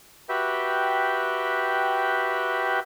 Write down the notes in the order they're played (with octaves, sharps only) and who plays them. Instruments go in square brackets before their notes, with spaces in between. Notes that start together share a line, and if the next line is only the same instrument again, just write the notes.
[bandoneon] F#4 G4 B4 E5 G5